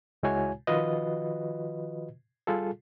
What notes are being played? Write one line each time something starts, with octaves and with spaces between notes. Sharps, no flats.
C#2 G#3 E4 F#4 C#5 G#5
D#3 F3 F4 F#4 B4 D#5
G3 F4 G#4 A4